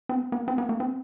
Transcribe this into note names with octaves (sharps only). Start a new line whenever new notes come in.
C4
B3
B3
A#3
C4
B3
A#3
C4